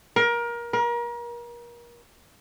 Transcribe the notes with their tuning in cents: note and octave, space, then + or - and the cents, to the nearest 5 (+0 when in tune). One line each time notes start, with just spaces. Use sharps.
A#4 +25
A#4 +35